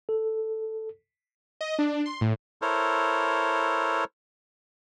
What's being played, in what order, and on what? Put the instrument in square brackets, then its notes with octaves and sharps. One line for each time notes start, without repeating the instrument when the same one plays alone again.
[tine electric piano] A4
[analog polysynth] D#5
D4
C6
A2
[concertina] E4 A4 A#4 C5 C#5